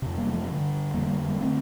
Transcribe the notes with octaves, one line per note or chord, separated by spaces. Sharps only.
F2 C3
G3 A#3
F3 A3
G2 D3
F2 D3 G3 A#3
G3 A#3
G3 A#3
D3 A3 C4